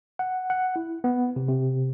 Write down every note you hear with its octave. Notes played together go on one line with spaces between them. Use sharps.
F#5
F#5
E4
B3
C3
C3